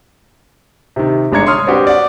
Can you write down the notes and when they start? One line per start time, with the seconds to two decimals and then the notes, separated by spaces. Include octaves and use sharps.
0.96 C3 D#3
1.32 G1 G#3 D4 A#5 G#6 C#7
1.46 C#5 C6 D#6 F6
1.67 C4 D4 F#4 G4 B4
1.87 D5 F#5